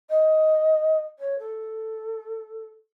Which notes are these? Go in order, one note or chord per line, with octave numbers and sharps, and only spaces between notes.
D#5
C#5
A4